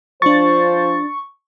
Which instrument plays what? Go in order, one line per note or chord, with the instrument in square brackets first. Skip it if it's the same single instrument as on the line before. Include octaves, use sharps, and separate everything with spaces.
[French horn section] F3 C5 [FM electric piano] D4 A6 [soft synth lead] C#6